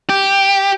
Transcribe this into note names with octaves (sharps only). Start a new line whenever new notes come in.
G4